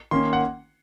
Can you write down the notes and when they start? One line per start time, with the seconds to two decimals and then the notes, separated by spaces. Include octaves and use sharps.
0.11 D#3 A#3 C#4 C6
0.33 F#5